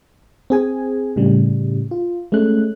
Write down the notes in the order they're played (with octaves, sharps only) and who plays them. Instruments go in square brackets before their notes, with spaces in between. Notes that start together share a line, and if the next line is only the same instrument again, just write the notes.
[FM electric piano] C4 G#4 G#5
A2 C#3 G3
F4
G#3 A3 C#4 F#6